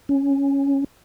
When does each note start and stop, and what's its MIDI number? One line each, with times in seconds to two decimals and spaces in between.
0.09 0.84 61